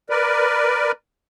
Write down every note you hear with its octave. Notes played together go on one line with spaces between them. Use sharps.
A#4 B4 D5